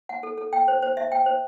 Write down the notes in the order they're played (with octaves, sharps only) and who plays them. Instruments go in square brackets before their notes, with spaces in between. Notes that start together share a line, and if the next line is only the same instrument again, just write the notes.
[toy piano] F#5
A4
A4
G5
C5
C5
E5
G5
C5